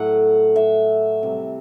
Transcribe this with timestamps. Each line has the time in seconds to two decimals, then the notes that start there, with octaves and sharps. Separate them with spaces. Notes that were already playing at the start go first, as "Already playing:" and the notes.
Already playing: A2 F#3 A3 F#5
0.56 E5
1.23 C3 G3